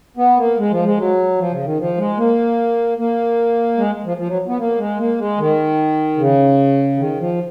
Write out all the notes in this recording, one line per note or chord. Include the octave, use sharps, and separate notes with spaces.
B3
A#3
G#3
F3
G#3
F#3
F3
C#3
D#3
F3
G#3
A#3
A#3
G#3
F3
F3
F#3
B3
A#3
G#3
A#3
G#3
D#3
C#3
D#3
F3